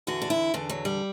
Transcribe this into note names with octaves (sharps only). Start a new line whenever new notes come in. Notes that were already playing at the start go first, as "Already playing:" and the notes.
E2 D3 F#4
D4
E4
E2 D3 D4
F#3
G3